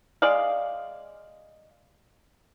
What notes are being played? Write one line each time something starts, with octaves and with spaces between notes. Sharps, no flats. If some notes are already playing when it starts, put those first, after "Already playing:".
G#3 D5 F5